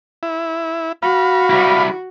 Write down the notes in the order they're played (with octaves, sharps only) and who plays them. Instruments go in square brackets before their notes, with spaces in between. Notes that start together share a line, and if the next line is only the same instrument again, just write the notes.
[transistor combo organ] E4
[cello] F#4 [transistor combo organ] F5 B5
[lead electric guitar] G3 E4